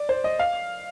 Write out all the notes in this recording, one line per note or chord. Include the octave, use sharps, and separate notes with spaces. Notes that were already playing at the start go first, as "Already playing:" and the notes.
Already playing: D5
C5
D#5
F5